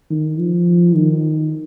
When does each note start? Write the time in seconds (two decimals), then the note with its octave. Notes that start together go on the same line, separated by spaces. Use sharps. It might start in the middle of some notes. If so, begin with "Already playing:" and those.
0.10 D#3
0.39 F3
0.95 D#3